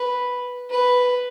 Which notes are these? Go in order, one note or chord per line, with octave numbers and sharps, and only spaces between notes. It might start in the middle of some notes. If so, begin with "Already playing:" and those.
Already playing: B4
B4